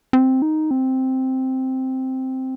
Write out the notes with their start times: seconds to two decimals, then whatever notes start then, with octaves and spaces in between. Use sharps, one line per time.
0.13 C4
0.42 D#4
0.71 C4